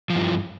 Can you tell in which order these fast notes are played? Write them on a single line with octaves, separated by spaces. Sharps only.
F3 E3 G2